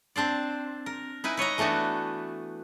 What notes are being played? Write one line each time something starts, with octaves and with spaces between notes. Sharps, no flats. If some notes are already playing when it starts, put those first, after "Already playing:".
C4 D4 C5 D5
A#4
D#4 E4 B4 G#5
B4 C#5 D#5 A#5
E3 A3 B3 D4 F#4